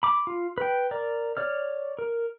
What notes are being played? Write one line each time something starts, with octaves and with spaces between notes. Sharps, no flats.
B5 D6
F4
B4 G5
A#4 D5
C#5 D5 F6
A#4